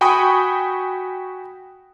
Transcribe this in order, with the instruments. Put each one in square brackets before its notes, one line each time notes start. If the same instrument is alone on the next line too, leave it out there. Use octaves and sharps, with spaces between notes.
[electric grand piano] F#4 G5 G#5 B5 C#6 D#6